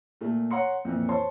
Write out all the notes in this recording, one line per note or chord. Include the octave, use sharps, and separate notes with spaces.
A#2 A3
C#5 F#5 A#5 C6 C#7
F2 A#2 E3
C5 C#5 A5 C6